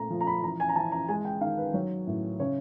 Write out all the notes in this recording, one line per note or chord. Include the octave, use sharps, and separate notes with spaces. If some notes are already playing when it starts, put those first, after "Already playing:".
Already playing: A#2 A3 A#5
F3
A#5
B5
E3 A#5
G#5
A#5
E3 A5
A#5
G#3 G#5
G5
D#3 F5
B4
F#3 C#5
A2
C#3 C#5